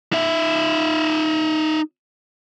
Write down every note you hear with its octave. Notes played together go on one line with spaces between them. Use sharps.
D#4 E5